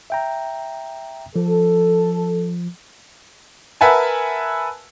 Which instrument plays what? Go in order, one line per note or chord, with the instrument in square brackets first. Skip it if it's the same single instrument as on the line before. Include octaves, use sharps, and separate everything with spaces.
[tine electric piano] E5 G5 A#5
[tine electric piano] F3 [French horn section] A4
[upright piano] A#4 B4 E5 F#5 G#5 A5